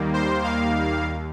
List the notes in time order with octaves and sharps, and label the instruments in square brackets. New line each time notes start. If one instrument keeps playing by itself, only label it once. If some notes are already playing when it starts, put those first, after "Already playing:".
Already playing: [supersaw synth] D#2 D#3 G3 A#3
C5
D#2 D#3 G3 A#3 F5
D#2